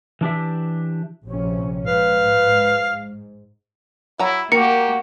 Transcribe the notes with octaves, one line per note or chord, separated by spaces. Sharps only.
E3 D4 G4 E5
A#1 C3 C#4
G#2 B4 F5
F#3 E4 A#5
A#3 F#4 G4 A#4 C#7